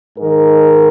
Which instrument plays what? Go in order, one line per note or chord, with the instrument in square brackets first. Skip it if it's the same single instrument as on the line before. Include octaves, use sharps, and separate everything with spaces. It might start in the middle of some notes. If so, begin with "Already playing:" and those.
[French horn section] G#2 D#3 A#4